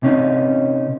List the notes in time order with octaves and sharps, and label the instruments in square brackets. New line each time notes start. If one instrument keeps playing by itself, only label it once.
[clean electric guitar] C3 C#4 D#4